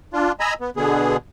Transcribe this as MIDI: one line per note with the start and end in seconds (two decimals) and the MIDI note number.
0.13 0.32 62
0.13 0.32 65
0.40 0.54 75
0.40 0.54 80
0.40 0.54 82
0.40 0.54 83
0.40 0.54 88
0.61 0.70 59
0.76 1.17 47
0.76 1.17 50
0.76 1.17 59
0.76 1.17 68